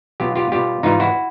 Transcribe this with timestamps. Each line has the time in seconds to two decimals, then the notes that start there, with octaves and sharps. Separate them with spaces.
0.20 B2 F#3 F4 G4
0.35 F4 G4
0.52 B2 G3 F4 G4
0.83 G#2 E3 G3 D#4 F4
1.00 E4 F#4